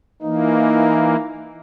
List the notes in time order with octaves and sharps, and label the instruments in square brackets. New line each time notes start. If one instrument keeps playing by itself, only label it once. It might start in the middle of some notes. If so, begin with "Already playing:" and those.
[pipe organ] E3 A#3 [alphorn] D#4